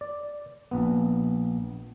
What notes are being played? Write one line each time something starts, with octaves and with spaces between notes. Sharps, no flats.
D5
A#1 B3